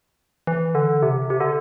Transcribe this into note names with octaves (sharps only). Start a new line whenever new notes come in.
E3
D3
C3
C3
D3